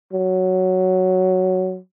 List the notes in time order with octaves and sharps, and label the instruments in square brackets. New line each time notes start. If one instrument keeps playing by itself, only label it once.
[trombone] F#3